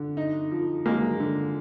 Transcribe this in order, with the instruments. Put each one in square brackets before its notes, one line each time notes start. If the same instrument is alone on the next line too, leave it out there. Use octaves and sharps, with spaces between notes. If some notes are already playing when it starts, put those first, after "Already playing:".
Already playing: [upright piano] D3
D#4
F3
[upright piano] G#3 [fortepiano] A#3
[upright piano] D3